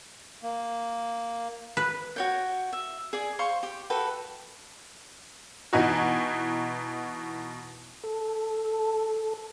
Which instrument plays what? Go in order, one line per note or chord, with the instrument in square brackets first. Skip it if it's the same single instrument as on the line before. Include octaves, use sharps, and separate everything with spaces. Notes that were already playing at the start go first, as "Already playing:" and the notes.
[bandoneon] A#3
[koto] B4
[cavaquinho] F#4 C#5 G5
E5
G#4 D5 G#5
C5 F5 C6 C#6
G4
F#4 A4 B4 G5
[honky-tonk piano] B2 E3 D#4 F#4
[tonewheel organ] A4